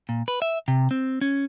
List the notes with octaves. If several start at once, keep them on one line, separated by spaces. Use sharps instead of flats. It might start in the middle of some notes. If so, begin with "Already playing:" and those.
A#2
B4
E5
C3
C4
C#4